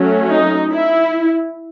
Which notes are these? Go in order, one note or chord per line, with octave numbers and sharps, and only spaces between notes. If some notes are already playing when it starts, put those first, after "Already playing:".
Already playing: F#3 A3 C#4
D#4
E4